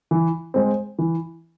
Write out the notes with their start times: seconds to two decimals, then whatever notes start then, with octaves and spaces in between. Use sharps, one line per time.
0.11 E3
0.54 G#3 C4
0.99 E3